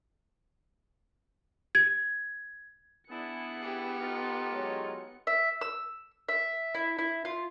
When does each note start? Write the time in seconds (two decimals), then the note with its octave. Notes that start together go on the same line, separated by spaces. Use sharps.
1.75 G#6
3.10 B3 D4 E4 G#4 C#7
3.62 G4
4.00 D#4 F4 A4
4.52 F#3 G#3 C#5
5.27 E5
5.61 E6
6.29 E5
6.75 E4
6.99 E4
7.25 F4